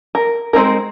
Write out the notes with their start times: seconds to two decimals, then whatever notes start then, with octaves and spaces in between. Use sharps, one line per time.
0.15 A#4
0.53 G#3 C4 D#4 A#4